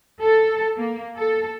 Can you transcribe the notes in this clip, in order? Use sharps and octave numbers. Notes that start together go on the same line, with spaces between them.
A4
A#3
A4